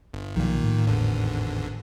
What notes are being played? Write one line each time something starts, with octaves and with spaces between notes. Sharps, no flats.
G1
B1 A#2 D#3 F3
A2
G#1 E2 D3